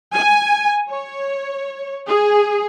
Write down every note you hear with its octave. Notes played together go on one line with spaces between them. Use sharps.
G#5
C#5
G#4